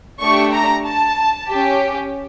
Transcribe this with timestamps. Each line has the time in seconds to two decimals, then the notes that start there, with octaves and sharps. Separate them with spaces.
0.20 A3 D4 G4 C#6
0.53 A#5
0.85 A5
1.49 C#4 G4